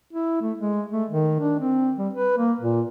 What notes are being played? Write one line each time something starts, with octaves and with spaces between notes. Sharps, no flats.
E4
A3
G#3
A3
D#3
D4
C4
G3
B4
A#3
A#2